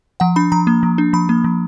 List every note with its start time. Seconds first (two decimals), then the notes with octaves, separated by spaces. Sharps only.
0.20 F3 F#5
0.36 D4 B5
0.52 F3 A#5
0.67 A#3
0.83 F3
0.98 D4
1.13 F3 B5
1.29 A#3
1.44 F3